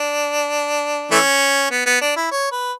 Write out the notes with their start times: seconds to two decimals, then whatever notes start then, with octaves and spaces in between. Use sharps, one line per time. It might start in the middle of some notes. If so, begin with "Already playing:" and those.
Already playing: D4
1.11 E3 A3 C#4
1.71 B3
1.86 B3
2.01 D4
2.16 E4
2.31 C#5
2.51 B4